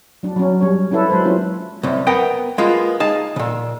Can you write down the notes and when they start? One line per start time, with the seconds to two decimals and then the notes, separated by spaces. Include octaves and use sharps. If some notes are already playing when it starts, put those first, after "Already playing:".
0.23 F#3 D4
0.36 F#3 C#4
0.60 G3 C#4 C#5
0.91 C#4 D4 E4 A4 B4
1.09 F#3 G#3 B4 C5
1.24 G#3 A#3 C#4 E4 F4
1.83 C2 F#2
2.07 B3 A#4 F#5 G5
2.58 G#3 A#3 B3 F4
3.00 D#4 G#4 F5 A5
3.36 A#2 C#3